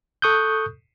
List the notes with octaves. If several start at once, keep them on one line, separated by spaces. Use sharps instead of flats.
A4 C#6 D#6 F#6 G6